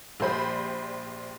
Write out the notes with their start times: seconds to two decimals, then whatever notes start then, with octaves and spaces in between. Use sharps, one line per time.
0.20 A#1 G3 C5 B5